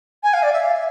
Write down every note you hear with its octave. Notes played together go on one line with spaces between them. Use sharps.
G#5
F5
D5
E5
F5
E5